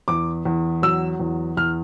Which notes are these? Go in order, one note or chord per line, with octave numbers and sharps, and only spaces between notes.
E2 D6
E2
F#3 E6
E2
E2 F6